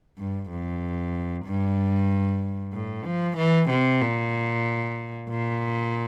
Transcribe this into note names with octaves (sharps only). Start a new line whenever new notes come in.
G2
F2
G2
A2
F3
E3
C3
A#2
A#2